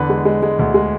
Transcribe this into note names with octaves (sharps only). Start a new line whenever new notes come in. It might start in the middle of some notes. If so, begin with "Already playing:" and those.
Already playing: E2 D3 B4
G#3
G#3
G#3
D2
G#3